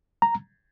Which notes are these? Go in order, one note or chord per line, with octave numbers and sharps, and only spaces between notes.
A#5